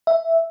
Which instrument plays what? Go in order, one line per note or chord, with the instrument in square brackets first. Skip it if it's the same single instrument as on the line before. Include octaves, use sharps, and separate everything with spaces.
[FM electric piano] E5